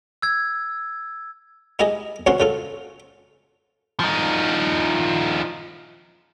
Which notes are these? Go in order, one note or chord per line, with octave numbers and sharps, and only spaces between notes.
E6 G#6
D#4 E4 G4 G#4 D#5
C#2 C4 C#4 F#4 C6
C#3 F4 A4
F3 D#4